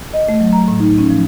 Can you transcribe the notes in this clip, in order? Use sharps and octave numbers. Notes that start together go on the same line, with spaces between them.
D#5
A3
F#3
A#5
A2
D#4
C#4
F3